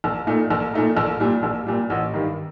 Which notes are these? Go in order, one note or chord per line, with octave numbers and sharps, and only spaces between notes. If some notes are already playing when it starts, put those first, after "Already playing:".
A#1
A#2 A3 D#4
A#1
A#2 A3 D#4
A#1
A#2 G3
A#1
A#2 G3
A1
G2 D#3